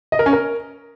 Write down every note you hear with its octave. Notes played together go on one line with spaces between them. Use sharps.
D#5
A#4
C#4
A#4